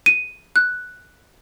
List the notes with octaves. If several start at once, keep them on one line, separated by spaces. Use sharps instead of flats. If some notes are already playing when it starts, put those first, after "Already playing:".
D#7
F#6